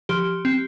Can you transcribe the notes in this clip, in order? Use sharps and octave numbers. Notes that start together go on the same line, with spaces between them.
F3 G4
C4